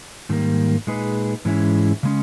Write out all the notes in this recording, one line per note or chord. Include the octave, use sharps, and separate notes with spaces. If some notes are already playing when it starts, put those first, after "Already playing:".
G#2 D#3 G3 A#3
A#2 G#3 D#4 G#4 B4
G#2 E3 G#3 C#4 E4
C#3 G#3 C#4